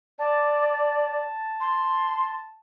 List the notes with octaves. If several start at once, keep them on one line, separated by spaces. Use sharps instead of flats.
D5 A5
C6